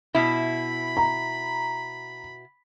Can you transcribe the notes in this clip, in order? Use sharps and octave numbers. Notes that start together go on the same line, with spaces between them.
B2 E4 B5
A#5